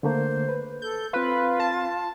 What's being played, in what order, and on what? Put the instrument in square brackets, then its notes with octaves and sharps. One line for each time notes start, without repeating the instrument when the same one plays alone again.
[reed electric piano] D3 A3 A#3 [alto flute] C5
[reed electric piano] B4
[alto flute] A4 [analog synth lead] G6
[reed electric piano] C4 F5 [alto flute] F4 [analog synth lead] B4
[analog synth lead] A5